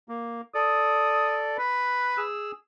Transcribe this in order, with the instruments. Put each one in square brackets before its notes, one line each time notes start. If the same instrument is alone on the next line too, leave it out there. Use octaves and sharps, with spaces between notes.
[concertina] A#3
[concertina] A4 D5 [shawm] D#6
[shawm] B4
[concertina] G#4 E6